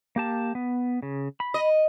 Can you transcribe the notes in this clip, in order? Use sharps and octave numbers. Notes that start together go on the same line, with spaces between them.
A#3 G4 A5
B3
C#3
B5
D#5